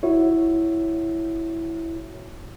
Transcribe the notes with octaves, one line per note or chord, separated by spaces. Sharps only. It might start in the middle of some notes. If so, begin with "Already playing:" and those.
E4 F#4 C#5 E5